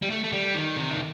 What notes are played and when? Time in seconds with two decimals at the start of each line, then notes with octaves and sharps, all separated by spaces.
0.02 G3
0.10 A3
0.24 A3
0.32 G3
0.54 D#3
0.76 C3
0.90 D#3